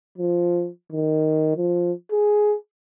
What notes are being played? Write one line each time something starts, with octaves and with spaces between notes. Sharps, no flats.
F3
D#3
F3
G#4